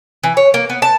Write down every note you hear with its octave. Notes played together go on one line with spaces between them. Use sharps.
E3
C#5
A#3
B3
A5